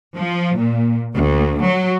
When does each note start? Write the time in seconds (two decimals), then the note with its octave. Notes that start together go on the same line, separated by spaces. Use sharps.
0.16 F3
0.57 A#2
1.15 D2
1.63 F#3